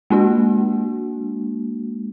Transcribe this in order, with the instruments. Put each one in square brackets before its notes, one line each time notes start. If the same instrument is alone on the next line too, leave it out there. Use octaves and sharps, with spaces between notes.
[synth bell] G#3 A#3 D4 F#4